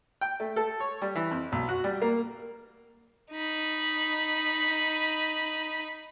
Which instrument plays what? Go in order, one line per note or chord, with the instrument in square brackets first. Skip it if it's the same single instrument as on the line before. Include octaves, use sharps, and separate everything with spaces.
[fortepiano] G5
A3
A4
C#5
G3
E3
F2
B1
F#4
G3
A#3
[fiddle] D#4 B5